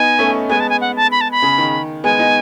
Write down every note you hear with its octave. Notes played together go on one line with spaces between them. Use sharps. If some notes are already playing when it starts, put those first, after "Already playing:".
Already playing: B3 D#4 G#5
A3 C#4
G#3 B3 G#5
A5
G#5
F#5
A5
B5
A5
B5
C#3
D#3
G#3 B3 G#5
B3 D#4